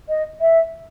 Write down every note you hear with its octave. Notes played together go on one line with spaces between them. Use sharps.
D#5
E5